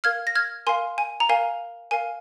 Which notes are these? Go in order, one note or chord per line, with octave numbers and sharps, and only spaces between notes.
A#4 F5 F6 G#6
A#6
F6 G#6
A#4 F5 G#5 C6
G#5
A#5
A#4 F5 G#5
A#4 F5 G#5